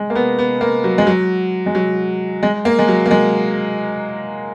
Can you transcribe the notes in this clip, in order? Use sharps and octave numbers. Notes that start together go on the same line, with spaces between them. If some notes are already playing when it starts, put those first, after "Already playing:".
Already playing: G#3
A#3
B3
B3
A#3
F#3
G#3
F#3
G#3
F#3
G#3
A#3
G#3
F#3
A#3
G#3